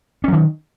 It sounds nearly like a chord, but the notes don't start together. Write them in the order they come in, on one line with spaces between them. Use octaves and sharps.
C#4 F#3 D#3